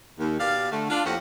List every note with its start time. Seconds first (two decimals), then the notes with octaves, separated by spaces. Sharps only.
0.19 D#2
0.39 B2 G4 D5 F5
0.71 D3 A3
0.90 D4 F4
1.05 F2 A2 F3 A#3 G4 F#5